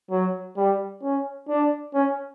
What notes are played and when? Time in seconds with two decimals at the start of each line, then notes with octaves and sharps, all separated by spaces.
0.10 F#3
0.57 G3
1.03 C#4
1.49 D4
1.94 C#4